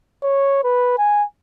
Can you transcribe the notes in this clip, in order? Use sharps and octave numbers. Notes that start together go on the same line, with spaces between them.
C#5
B4
G#5